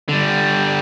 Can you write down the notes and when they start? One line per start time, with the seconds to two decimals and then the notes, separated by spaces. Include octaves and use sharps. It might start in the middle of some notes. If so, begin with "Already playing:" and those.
0.09 D3 G3